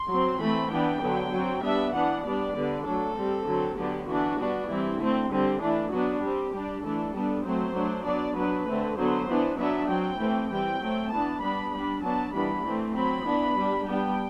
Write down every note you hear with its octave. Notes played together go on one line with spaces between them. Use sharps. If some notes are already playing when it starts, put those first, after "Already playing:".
Already playing: C6
F#3 C4
E3 A3 C4 B5
E3 B3 D4 G5
D3 F#3 B3
F#3 C4
G3 B3 D4 E5
E3 B3 D4 F#5
G3 B3 D4 D5
D3 G3 B3
F#3 A3 D4 A4
G3 C4
D3 F#3 C4
D3 F#3 B3 D4 G4
E3 B3 D4 F#4
G3 B3 D4
E3 G3 C4 E4
D3 A3 C4
D3 G3 C4
E3 A3 D4 E4
F#3 B3 D4 F#4
G3 C4 G4
G3 D4
E3 A3 D4 A4
G3 B3 D4
F#3 A3 C4 C5
F#3 A3 D4
F#3 B3 D4 D5
F#3 B3 D4 B4
D3 A3 C4
D3 F#3 B3 C5
E3 B3 D4
F#3 B3 D4 E5
F#3 C4 G5
E3 A3 C4
E3 G3 C4 G5
F#3 A3 C4
E3 B3 D4 A5
G3 B3 D4 B5
G3 D4 B5
F#3 B3 D4 A5
E3 G3 B3 D4 B5
E3 A3 C4
F#3 C4 B5
E3 B3 D4
G3 D4
G3 B3 D4 G5